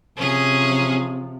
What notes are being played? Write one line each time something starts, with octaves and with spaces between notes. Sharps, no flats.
C3 F3 C#4 G#4